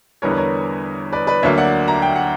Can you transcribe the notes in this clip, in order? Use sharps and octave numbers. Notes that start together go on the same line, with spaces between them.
E2 D3 G3 B3 A#4 C#5
B4
A#4 C#5
B4 D5
B4 D5
D2 D3 F#3 A#3 C#5 E5
D5 F#5
A#5
G5
F#5